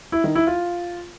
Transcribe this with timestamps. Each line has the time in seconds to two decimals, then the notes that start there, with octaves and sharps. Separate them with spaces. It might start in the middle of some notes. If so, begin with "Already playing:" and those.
0.12 E4
0.24 D#3
0.35 E4
0.47 F4